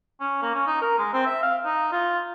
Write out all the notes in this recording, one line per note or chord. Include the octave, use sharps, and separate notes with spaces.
C#4
A#3
C#4
D#4
A#4
G#3
C4
E5
F5
D#4
F4